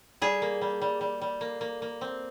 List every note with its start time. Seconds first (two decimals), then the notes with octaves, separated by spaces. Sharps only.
0.22 G3 G#4
0.42 A#3
0.61 G3
0.82 G3
1.01 G3
1.21 G3
1.41 A#3
1.61 A#3
1.82 A#3
2.01 C4